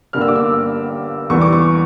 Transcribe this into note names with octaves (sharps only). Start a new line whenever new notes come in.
G1 G2 D3 G3 A#3 F6
E6
D6
E6
E2 E3 G3 C#6
D6
C#6